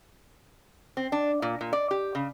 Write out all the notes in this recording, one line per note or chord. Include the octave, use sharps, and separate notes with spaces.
C4
D4
A#2
A#2
D5
G4
C#3